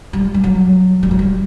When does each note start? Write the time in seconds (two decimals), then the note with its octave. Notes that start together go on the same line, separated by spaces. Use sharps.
0.13 G3
0.34 G3
0.44 F#3
1.03 G3
1.11 F#3
1.19 G3